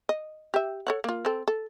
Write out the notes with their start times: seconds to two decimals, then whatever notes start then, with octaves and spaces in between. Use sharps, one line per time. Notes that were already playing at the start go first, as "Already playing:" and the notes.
0.09 D#5
0.54 G4 E5
0.87 A4 C#5 F#5
1.04 A#3 F4
1.25 C4 A4
1.48 A4